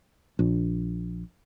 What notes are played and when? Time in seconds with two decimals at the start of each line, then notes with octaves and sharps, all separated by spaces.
0.39 A#1